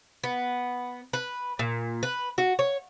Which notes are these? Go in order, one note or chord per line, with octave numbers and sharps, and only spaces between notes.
B3
B4
A#2
B4
F#4
C#5